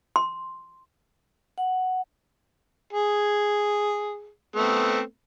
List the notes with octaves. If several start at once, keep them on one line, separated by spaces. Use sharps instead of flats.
C6
F#5
G#4
A3 B3 C4